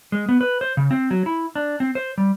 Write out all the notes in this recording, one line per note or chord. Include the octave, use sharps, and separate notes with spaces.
G#3
B3
B4
C5
C#3
C4
F#3
E4
D4
C4
C5
G3